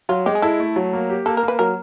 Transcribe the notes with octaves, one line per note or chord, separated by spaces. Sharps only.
F#3 F4
G#3 G4
G#4
E4 A4
A3
F#3
A#3
G4
A#3 A4
A#4
A#3 B4
F#3 A#4